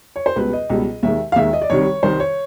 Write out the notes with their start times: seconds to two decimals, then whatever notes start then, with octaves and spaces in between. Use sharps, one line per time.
0.16 C#5
0.26 C5
0.36 C#2 B2 G3 B4
0.53 D#5
0.70 C#2 B2 G3
1.03 D#2 D#3 G#3 E5
1.32 F5
1.36 D#2 D#3 G#3 E5
1.53 D#5
1.62 D5
1.70 C2 C3 D#3 G3 C#5
2.03 C2 C3 D#3 G3 C5
2.20 C#5